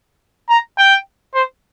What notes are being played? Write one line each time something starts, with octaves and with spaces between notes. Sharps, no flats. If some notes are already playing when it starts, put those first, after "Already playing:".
A#5
G5
C5